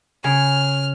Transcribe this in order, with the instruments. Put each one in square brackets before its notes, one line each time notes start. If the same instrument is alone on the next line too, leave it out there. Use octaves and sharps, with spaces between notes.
[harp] C#3 [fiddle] F6